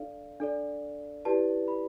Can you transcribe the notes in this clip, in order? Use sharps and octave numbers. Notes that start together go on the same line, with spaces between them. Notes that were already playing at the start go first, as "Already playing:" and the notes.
Already playing: D4 A4 D5 F5
D4 A4 D5
E4 G4 B4 D5 A5
B5